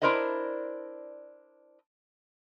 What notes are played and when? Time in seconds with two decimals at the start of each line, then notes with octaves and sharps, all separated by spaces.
0.02 D4 E4 A#4 C5 D5 D#5